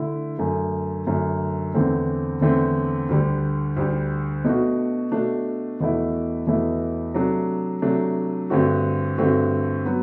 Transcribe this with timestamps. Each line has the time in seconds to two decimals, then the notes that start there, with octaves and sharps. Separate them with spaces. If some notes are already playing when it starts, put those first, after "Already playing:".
Already playing: D3 A3 E4
0.38 F#2 D3 A3
1.07 F#2 D3 A3
1.74 E2 D3 A3 C4
2.41 E2 D3 A3 C4
3.09 D2 D3 G3
3.76 D2 D3 G3
4.45 B2 A3 D4 F#4
5.12 B2 A3 D4 F#4
5.80 E2 B2 A3 E4
6.47 E2 B2 A3 E4
7.14 C3 F#3 A3 D4
7.82 C3 F#3 A3 D4
8.50 G2 D3 A3 C4 F#4
9.18 G2 D3 A3 C4 F#4
9.85 F#3 B3